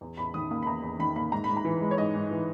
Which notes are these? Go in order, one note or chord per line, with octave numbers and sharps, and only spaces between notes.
E2
E2 B5
D#3 D#6
A#3 D#6
B5
E2 A#5
E2
D#3 B5
A#3 B5
G#2 A#5
B5
G#2
A#5
E3
G#3
C#5
G#2 D#5
G#2
E3